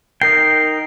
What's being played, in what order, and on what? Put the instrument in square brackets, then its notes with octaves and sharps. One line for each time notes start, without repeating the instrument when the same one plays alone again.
[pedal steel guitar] D#4 A#4 G5 [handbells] C7